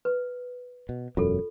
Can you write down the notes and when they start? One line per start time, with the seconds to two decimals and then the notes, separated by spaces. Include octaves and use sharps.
0.05 B4
0.89 B2
1.17 E1 F#2 F4 A4